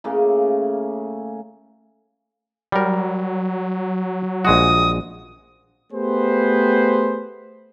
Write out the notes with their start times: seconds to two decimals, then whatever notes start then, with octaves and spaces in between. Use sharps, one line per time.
0.04 A2 C#3 A#3 G#4
2.72 F#3 G3 A#4
4.45 A#1 G#3 F#4 D#6
5.93 A3 B3 G4 G#4 B4 C5